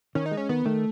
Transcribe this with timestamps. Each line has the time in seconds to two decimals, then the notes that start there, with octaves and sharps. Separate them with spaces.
0.15 D#3 C#4
0.26 D#4
0.31 G#3
0.37 C#4
0.49 D#3 B3
0.66 D#3 A3